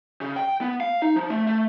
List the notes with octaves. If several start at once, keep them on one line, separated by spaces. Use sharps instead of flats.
C#3
G5
B3
F5
D#4
F3
A3
A3